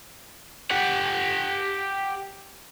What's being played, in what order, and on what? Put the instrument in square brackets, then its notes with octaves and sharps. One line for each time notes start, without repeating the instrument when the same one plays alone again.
[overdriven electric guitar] G4 F#5